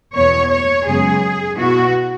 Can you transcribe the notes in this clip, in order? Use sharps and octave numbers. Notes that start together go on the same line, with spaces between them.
E2 B2 B3 C#5
C#5
F#2 C#3 G#3 B3 G#4
B2 B3 E4 F#4